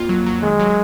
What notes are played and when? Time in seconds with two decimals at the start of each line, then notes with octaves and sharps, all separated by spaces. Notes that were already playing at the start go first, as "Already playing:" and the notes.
Already playing: F2 A#3 F4
0.09 F#3
0.26 F#3
0.43 D#3 G#3
0.59 F#3